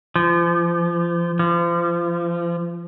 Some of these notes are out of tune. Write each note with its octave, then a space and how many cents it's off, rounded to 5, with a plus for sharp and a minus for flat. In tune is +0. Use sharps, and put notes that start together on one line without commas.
F3 -30
F3 -30